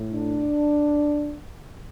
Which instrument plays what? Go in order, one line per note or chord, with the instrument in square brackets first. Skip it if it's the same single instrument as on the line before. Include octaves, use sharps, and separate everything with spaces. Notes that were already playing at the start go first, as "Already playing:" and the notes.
Already playing: [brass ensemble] A2
D4